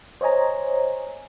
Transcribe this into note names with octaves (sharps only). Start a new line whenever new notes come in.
C5 C#5 D#5 G#5 A#5